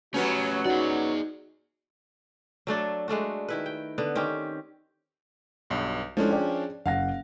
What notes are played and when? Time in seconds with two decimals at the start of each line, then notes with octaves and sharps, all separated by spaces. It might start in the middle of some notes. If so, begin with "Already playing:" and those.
0.14 F#3 A3 B3 C#4 F#4 G4
0.66 D#4 F#4 G#4 D5
2.67 F#3 A3 D4 A4
3.08 G#3 A3 D4 F#4
3.48 D#3 E4 B4
3.66 G5
3.98 D3 B3
4.15 D#3 C4 C#4 G4
5.70 B1 G2
6.17 F3 G#3 C#4 D4 E4 A4
6.31 G#4 D5 G5
6.86 F#1 F5 F#5 A#6